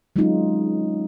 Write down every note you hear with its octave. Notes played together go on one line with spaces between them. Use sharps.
F#3 G#3 C4 C#4 D#4 F4